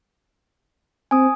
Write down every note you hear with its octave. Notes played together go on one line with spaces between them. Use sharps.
C4 G#5 D#6